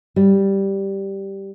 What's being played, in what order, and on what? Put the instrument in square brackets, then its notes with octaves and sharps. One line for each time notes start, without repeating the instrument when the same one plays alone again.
[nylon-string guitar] G3